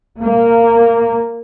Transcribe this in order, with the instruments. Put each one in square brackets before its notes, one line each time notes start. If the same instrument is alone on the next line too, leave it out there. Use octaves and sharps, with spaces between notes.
[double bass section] A#3